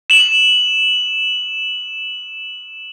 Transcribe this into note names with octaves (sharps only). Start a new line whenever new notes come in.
E7 F#7